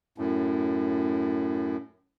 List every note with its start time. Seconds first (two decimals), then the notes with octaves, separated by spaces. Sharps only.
0.18 F#2 A2